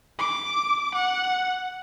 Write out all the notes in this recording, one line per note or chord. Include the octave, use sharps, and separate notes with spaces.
D6
F#5